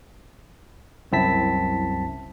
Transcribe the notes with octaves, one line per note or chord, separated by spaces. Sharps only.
C2 F#2 C4 E4 A5 B6